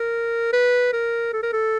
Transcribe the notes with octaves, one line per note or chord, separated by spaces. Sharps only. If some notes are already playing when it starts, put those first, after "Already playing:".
Already playing: A#4
B4
A#4
A4
A#4
A4